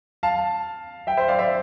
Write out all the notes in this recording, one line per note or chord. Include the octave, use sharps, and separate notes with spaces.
F5 A5
E5 G5
C5 E5
D5 F5
C5 E5